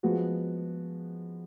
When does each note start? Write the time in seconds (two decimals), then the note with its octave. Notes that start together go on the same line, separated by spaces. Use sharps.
0.03 F3 G#3 B3 F#4